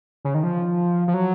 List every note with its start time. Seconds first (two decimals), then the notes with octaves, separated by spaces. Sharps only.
0.25 C#3
0.34 D#3
0.43 F3
1.08 F3
1.14 F#3